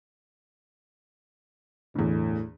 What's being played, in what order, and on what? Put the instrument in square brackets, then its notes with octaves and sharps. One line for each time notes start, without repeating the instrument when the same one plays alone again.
[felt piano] G1 E2 [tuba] A2